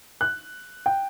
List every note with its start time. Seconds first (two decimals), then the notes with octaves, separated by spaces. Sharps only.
0.21 F#6
0.86 G5